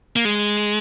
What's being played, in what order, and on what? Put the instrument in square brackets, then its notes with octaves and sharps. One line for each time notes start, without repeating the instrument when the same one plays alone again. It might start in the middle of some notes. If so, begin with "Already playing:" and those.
[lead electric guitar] A#3
G#3